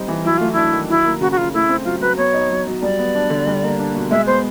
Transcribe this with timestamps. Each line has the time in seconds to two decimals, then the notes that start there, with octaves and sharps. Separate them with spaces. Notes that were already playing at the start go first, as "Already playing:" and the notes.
Already playing: G3 C4 D#4
0.08 E3
0.24 F#3 E4
0.38 A3 F4
0.53 D4 E4
0.72 D#3
0.88 F#3 E4
1.05 A#3
1.20 C#3 F#4
1.32 F#4
1.37 C#3 F4
1.54 A3 E4
1.69 C4
1.85 F#3 F4
2.01 F#3 B4
2.17 B3 C#5
2.33 D#4
2.49 F#3
2.66 F#3
2.82 G3 D5
2.99 B3
3.15 D4
3.30 D3
3.47 G3
3.63 A#3
3.79 D4
3.95 B2
4.10 G#3 E5
4.27 B3 C5